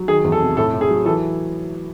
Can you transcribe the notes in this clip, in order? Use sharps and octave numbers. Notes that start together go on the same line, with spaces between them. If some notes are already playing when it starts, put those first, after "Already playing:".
Already playing: F#3
D#3 G#4
E2
A4
C3
A2 A4
A2
G#4
F#3
E3 A4